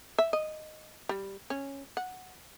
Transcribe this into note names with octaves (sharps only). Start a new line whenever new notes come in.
E5
D#5
G3
C#4
F#5